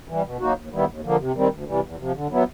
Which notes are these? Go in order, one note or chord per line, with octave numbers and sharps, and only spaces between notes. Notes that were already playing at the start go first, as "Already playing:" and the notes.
E3 G3
B2
F#3 A#3 D#4 F#4
D#2
D#3 G3 B3 E4
D#2
D3 F3 A#3
C3
D#3 G3 C4
D2
C3 E3 G3
E2
C3 F3
D3
F#3 B3 E4